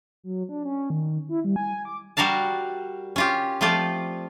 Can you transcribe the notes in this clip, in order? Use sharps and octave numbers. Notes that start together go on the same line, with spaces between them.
F#3
D4
C#4
D#3
E4
G3
G#5
D6
G3 F#4 A#4 F5 A5
C#4 F4 G4
F3 A3 C4 F4 D5